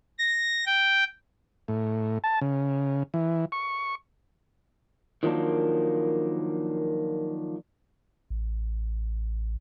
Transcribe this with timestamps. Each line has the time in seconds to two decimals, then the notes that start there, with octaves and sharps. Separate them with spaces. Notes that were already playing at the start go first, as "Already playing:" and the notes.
0.19 A#6
0.66 G5
1.68 A2
2.24 A5
2.41 C#3
3.14 E3
3.52 C#6
5.23 D#3 F3 F#3 A#3 D4
8.30 A1